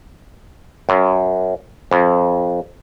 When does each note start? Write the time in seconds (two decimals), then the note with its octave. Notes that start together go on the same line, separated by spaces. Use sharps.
0.89 F#2
1.91 F2